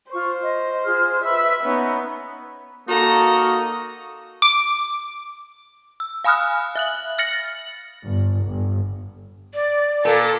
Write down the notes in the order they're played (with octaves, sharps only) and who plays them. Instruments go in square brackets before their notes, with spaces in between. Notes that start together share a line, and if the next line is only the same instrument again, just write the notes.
[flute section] F4 C#6 [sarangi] C5
[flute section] D#5
F4 G#4 F6
[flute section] B4 B5 E6 [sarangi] E5
[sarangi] B3 [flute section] C#4 D#4
[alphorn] A#3 [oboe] D#4 [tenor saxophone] F#4 [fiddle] A4 A#5
[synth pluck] D6
[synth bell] E6
F5 G#5 B5 D#6 F6 F#6
E5 F#6 F#7
F6 A6 A#6 C#7 F#7
[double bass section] G1
G1
[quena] D5
[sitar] A#2 [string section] A4